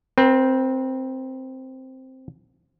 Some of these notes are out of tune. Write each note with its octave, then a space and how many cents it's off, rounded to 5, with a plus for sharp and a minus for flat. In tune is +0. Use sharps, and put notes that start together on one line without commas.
C4 +0 B4 -45